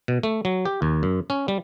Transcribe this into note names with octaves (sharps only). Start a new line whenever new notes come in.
B2
A3
F#3
G4
D#2
F#2
C#4
G3